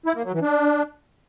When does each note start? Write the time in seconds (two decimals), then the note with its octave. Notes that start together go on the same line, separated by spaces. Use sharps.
0.06 E4
0.15 A#3
0.24 F#3
0.33 E3
0.42 D4